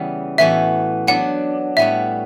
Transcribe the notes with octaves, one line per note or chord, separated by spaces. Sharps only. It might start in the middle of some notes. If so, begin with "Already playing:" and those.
Already playing: C#3 E3 G3 B3
A2 E3 B3 F#4 E5
F#3 B3 D4 F#5
A2 G3 B3 F#4 E5